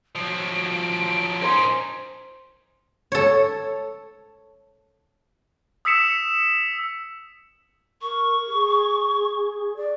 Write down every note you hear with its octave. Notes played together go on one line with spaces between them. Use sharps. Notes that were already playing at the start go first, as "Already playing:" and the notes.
F3 F#3 D7
C#4 D#4 C5
A4 C#5
D#6 E6 B6 C#7 E7
A#4 C#6
G#4
D5